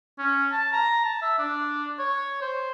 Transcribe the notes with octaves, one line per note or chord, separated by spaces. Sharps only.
C#4
A5
A#5
A5
E5
D4
C#5
C5